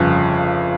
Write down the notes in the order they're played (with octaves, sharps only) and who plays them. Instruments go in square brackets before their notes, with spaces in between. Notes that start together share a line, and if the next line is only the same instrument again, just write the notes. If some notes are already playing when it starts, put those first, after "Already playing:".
Already playing: [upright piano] G1 F2 C#3